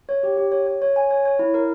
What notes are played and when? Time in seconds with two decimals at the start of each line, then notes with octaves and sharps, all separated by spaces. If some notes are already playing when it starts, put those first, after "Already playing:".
0.09 C#5
0.23 G4
0.37 G4
0.52 C#5
0.66 C#5
0.82 C#5
0.96 G#5
1.11 C#5
1.25 C#5
1.39 E4
1.54 A#4